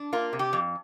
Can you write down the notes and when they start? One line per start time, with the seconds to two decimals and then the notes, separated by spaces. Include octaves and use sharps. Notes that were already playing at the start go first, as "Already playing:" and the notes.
Already playing: D4
0.13 A#3 F4
0.33 C3
0.39 G4
0.53 F2